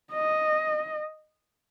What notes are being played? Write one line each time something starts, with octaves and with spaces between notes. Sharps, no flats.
D#5